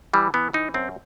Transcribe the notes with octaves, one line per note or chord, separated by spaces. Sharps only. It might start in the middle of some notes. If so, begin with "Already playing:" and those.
E3 G3
E3 B3
E3 D#4
F#2 C4